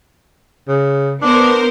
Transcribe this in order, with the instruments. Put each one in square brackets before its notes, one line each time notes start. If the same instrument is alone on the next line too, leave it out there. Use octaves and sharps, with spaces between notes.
[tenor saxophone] C#3
[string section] B3 A#4 C5 [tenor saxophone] D4